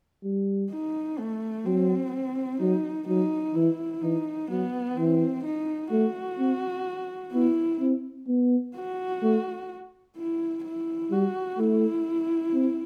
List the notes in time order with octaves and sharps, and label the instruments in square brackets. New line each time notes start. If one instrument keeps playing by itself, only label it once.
[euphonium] G3
[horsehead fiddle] D#4
A3
[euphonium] F#3 [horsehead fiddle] C4
[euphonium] F#3 [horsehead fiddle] D#4
[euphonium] F#3 [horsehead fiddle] D#4
[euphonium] E3 [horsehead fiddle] E4
[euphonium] E3 [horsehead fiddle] D#4
[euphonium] F#3 [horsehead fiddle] B3
[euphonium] E3 [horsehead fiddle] C4
[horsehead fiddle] D#4
[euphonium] A3 [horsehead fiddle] F#4
[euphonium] C4
[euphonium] B3 [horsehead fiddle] E4
[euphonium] C4
B3
[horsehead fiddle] F#4
[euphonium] A3
[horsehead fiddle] E4
E4
[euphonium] G3 [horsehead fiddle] F#4
[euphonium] A3 [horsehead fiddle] E4
[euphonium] C4